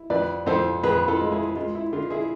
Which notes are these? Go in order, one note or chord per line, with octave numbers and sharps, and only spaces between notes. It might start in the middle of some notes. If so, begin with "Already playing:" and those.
Already playing: E4
F2 B4 D5
F2 A4 C5
F2 G#4 B4
F4 A4
G#3
E4 G#4
G#3 F4
E4
D3 F4
E4 G#4